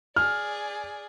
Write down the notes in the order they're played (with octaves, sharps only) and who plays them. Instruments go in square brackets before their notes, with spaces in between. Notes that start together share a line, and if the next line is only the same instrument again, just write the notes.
[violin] G#4 D5 [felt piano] F6